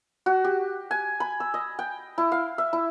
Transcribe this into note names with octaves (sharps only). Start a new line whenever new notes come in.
F#4
G4
G#5
B5
E6
D#5
G5
E4
F5
E5
E4